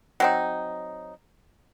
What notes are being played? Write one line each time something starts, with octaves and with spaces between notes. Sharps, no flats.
F#3 C4 D#4